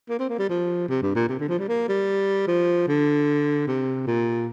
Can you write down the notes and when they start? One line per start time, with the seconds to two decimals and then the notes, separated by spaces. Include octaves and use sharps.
0.09 A#3
0.19 C4
0.29 A#3
0.39 G3
0.49 F3
0.88 C3
1.02 G2
1.15 A#2
1.28 C3
1.39 D3
1.48 F3
1.59 G3
1.68 A#3
1.88 G3
2.47 F3
2.88 D3
3.67 C3
4.07 A#2